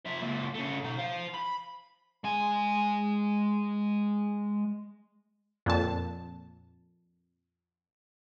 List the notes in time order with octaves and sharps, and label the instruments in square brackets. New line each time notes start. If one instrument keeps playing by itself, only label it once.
[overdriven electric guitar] F3 E5
C#2 A#2
C#3 A3
B2 D#4
C5 F5
B5
[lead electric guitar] G#3 G#5
[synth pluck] F2 A#2 A5